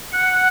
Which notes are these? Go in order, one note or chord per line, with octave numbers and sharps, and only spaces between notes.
F#5